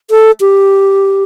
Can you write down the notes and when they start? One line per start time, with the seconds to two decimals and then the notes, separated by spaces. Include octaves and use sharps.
0.10 A4
0.40 G4